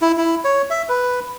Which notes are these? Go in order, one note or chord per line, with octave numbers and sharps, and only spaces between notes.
E4
E4
C#5
E5
B4